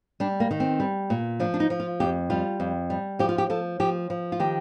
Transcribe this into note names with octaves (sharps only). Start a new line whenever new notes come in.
G3 D4
A#3
D#3
C4
G3
A#2
F3 D4
D4
D#4
F3
F4
F2 G4
G3 F4
F2
G3
F3 G4
F4
G4
F3 A4
F3 G4
F3
F4
D#3 G4